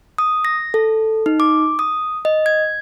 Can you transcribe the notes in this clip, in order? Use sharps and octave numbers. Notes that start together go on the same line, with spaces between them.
D#6
A#6
A4
D#4
D6
D#6
D#5
G#6